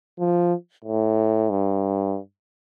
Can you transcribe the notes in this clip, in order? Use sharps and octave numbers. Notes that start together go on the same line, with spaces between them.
F3
A2
G2